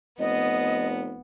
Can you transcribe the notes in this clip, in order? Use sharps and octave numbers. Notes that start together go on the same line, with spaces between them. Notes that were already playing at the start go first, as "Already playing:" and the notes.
F1 B3 D#5